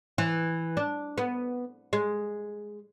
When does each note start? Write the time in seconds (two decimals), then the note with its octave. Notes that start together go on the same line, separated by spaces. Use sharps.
0.18 E3
0.77 D4
1.18 B3
1.93 G#3